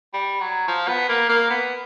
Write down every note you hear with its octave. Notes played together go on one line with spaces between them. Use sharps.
G3
F#3
F3
B3
A#3
A#3
B3